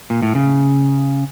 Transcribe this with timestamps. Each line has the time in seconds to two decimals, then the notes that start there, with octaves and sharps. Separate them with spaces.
0.10 A#2
0.22 A2
0.35 C#3